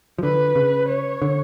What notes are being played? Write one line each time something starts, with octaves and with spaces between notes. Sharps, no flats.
F3
D3 B4
C#3
C#5
D3